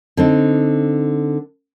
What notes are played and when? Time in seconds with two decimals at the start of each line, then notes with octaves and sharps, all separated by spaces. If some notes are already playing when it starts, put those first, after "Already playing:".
0.17 D3 C4 D#4